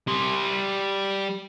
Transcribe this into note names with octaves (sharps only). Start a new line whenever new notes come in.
G3 C6